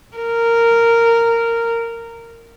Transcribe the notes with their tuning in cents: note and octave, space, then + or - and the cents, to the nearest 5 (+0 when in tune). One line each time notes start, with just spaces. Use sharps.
A#4 -10